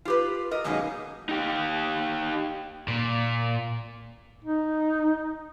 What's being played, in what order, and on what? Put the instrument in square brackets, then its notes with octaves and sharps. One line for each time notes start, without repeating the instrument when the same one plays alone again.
[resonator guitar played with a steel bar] F4 G4 B4
A#4 D#5
F#2 B2 G#3 A#3 C#4 D#4
[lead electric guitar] D#4 G4
[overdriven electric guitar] A#2
[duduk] D#4